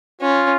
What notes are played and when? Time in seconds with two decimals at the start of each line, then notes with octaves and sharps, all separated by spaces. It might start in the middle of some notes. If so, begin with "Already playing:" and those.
0.21 C#4 F4